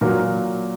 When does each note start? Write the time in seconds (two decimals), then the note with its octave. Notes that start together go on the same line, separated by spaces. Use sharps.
0.01 A#2 F#3 A#4